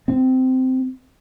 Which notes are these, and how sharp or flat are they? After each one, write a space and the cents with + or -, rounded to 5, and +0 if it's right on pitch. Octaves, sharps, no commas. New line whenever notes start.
C4 -15